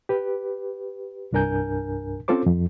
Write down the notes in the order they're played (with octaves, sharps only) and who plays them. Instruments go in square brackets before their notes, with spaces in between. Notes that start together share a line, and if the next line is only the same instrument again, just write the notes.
[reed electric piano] G4 B4
C2 G2 D4 A#4 G#5 G6
C4 C#4 F4 A4 C5 D6
F2